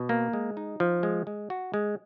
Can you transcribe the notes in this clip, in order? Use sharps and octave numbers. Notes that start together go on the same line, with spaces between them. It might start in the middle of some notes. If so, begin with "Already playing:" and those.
Already playing: B2
A#3
G#3
D#4
F3
G#3
G#3
F#4
G#3